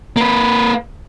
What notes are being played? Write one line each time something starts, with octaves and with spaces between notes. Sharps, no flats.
A#3 B4